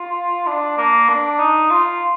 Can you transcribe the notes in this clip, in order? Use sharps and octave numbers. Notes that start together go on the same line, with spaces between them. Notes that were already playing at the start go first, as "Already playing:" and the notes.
Already playing: F4
D4
A#3
D4
D#4
F4